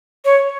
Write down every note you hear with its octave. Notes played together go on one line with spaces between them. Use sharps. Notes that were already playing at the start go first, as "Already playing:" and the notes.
C#5